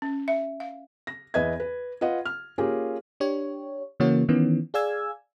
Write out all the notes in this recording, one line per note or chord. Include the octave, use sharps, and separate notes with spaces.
C#4
E5
F5
A#6
E2 B4 D#5 E5 G#6
B4
F4 B4 D#5 F#5
F6
A#3 C#4 F4 G4 G#4 A#4
D4 G4 C#5
C#3 E3 A#3 C#4 F#4 C#5
D#3 E3 B3 C#4
G#4 D5 F5 G#5 E6 G#6